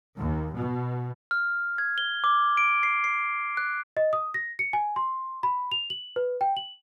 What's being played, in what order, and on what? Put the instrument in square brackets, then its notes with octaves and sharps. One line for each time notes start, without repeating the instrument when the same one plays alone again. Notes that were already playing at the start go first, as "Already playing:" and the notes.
[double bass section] D#2
B2
[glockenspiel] F6
G#6
G7
D6
D7
C7
C7
F#6
[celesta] D#5
D#6
A#6
C#7
G#5
C6
B5
F7
F#7
B4
G5
F#7